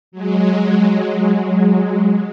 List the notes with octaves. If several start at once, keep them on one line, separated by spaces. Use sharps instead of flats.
F#3 G#3